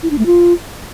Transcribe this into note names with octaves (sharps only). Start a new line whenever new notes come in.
E4
D4
A3
F4